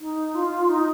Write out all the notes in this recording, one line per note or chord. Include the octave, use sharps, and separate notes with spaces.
D#4
F4
D#4